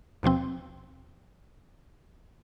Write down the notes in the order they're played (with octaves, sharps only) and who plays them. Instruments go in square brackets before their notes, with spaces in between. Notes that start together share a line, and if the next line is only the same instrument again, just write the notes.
[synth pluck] D#2 B2 F3 C4